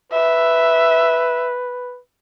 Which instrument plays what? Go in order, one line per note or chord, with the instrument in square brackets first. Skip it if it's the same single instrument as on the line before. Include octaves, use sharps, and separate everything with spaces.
[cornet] B4 [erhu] E5